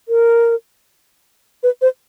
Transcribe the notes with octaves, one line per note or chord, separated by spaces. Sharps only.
A#4
B4
C5